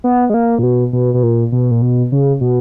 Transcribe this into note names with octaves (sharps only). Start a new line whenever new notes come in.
B3
G#3
A#3
A#2
B2
B2
B2
A#2
B2
A#2
B2
C#3
B2